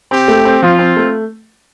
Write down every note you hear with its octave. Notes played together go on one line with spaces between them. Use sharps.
C4 G4
A3
C4
F3 F4
C4
A3